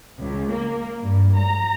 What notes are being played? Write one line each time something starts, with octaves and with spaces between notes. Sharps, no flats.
C#2
A#3
G2
A#5